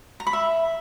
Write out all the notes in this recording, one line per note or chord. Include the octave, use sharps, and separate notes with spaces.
A#5
B5
E5